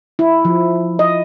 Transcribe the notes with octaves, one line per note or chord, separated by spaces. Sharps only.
E4
F3
D#5